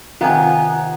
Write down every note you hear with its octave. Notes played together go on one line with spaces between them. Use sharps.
C3 D#3 B3 D#4 F4 G#5